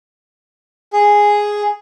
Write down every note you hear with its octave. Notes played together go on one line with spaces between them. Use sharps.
G#4